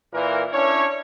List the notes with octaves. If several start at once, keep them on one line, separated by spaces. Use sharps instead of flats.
A#2 E3 A#4
C#4 D4 E4 C#5